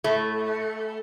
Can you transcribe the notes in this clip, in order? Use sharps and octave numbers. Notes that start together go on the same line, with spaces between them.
A2 A3